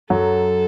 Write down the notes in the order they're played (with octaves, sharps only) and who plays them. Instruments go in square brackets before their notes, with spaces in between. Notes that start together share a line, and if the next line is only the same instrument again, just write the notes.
[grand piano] F#2 F#3 [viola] A4